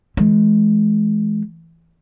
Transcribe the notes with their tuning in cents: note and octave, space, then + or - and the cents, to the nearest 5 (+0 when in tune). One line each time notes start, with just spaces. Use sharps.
E3 +0 G#3 +30